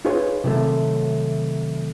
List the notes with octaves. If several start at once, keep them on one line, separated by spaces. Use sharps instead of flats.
D#4 F4 G#4 B4 C#5
C3 D#3 F#3 A3